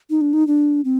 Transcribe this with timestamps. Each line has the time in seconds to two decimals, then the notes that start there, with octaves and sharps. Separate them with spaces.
0.10 D#4
0.21 D4
0.33 D#4
0.47 D4
0.85 C4